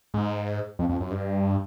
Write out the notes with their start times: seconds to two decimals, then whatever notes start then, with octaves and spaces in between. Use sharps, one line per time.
0.14 G#2
0.79 F2
0.89 F2
1.01 F#2
1.11 G2